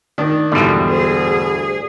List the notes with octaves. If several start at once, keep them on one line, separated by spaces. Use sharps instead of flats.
D#3 D4
E2 G#2 B2 D3 G3
D2 G#4